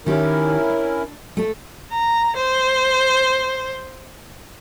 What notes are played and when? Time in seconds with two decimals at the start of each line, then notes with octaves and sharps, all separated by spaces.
0.06 D#3 C#4 E4 G4 A#4
0.70 D4
1.37 A3 A4
1.92 A#5
2.36 C5